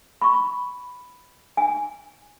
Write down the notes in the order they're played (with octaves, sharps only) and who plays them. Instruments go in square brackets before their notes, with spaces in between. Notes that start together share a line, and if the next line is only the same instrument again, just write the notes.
[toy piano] B5 C#6
G#5